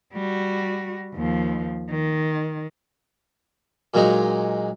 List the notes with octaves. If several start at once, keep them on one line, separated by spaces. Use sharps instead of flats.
G3 F#4
D#2 F3
D#3
A#2 F#3 G#3 D#4